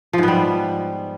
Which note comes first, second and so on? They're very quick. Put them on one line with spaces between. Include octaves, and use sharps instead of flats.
F3 G#2 B3 G3